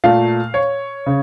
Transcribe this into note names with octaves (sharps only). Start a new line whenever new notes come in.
A#2 A3 F5
C#5
C#3